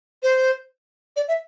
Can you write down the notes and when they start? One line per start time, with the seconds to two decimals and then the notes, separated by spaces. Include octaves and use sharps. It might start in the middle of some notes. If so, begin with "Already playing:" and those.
0.23 C5
1.16 D5
1.28 E5